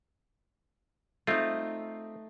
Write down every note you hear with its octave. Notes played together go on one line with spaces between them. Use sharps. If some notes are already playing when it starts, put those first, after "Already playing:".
A3 C4 D#4 F4